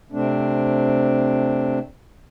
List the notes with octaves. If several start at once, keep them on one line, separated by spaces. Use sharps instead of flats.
C3 A3 C4 D4